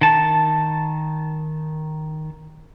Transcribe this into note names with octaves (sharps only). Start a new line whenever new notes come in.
D#3 A5